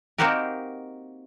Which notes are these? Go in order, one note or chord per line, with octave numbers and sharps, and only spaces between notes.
A#3 C4 D#4 F#4 G4 A#4